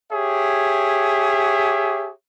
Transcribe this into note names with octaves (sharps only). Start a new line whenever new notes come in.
G4 G#4 C#5 E5